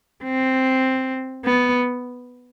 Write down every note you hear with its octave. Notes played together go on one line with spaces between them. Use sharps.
C4
B3